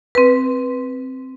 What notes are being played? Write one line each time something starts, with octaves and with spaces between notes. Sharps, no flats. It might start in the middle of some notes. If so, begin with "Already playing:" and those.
C4 B4